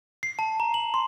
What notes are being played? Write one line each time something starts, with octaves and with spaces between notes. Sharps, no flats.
C7
A5
A#5
F#7
C6